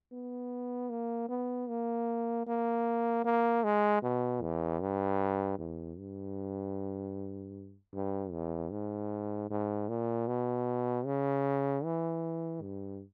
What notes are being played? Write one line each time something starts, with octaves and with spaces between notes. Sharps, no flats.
B3
A#3
B3
A#3
A#3
A#3
G#3
B2
E2
G2
E2
G2
G2
E2
G#2
G#2
A#2
B2
C#3
E3
G2